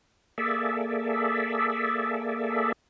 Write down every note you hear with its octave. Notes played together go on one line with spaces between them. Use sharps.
A#3 G#4 A4 D5 E5